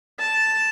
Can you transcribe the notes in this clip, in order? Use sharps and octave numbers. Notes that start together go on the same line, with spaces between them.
A5